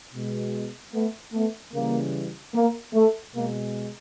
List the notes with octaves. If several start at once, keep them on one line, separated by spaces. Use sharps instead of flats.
B2 G#3
A3 B3
A3 B3
C#3 E3 G3 A#3
A#3
A3
B2 G#3 A#3